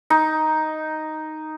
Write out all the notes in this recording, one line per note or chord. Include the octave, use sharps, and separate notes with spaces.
D#4